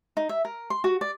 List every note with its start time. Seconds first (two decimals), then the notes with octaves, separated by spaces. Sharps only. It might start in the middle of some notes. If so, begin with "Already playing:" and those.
0.17 D#4
0.29 E5
0.45 A#4
0.70 C6
0.84 F#4
1.01 D5